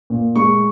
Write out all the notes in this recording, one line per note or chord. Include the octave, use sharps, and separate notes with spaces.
A#2
G#3 C#6